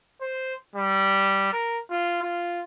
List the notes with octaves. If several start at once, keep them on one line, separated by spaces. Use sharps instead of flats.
C5
G3
A#4
F4
F4